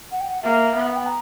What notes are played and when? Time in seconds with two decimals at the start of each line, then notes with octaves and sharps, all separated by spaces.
0.12 F#5
0.20 G5
0.28 F#5
0.43 A#3 E5
0.75 B3 E5
0.87 F#5
0.96 G5
1.06 A#5